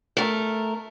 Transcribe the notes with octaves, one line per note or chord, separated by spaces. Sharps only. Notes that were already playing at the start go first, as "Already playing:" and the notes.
A3 A#4